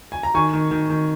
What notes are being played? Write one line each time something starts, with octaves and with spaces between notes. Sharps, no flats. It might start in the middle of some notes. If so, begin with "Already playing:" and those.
G#5
A#5
D#3 G#5 C#6
D#3
D#3
D#3